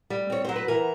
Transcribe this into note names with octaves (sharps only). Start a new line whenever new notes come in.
G3
C4 C#5
F#3 C5
B4
E3 A#4